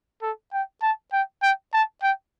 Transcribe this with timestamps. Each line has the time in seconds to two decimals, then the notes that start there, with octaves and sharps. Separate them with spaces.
0.22 A4
0.53 G5
0.83 A5
1.13 G5
1.42 G5
1.73 A5
2.03 G5